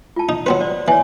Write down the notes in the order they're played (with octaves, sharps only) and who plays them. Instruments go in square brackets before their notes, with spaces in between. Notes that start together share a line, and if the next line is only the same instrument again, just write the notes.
[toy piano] F4 A5
[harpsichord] D#4
[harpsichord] F#3 C4 B4 [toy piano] C6
[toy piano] C5 D5
[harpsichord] E3 [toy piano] C#5 G#5